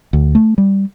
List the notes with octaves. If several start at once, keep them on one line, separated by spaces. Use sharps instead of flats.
D2
A3
G3